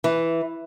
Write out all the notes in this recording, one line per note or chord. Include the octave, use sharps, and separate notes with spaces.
E3